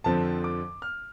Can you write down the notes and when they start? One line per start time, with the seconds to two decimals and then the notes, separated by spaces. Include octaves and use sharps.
0.04 F2 D3 F3 C4 A5
0.44 D6
0.82 F6